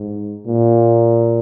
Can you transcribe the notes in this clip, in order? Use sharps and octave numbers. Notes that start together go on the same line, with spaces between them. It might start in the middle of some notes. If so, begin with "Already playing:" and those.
Already playing: G#2
A#2